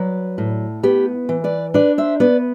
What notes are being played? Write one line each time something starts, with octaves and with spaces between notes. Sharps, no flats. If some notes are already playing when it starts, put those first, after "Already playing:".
Already playing: F#3 B4 D5
A2
B3 G4 B4
E3
B4 D5
D4 B4 D5
C5 E5
B3 B4 D5